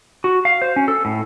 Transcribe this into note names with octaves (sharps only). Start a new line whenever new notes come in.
F#4
F5
C5
C#4
A4
A2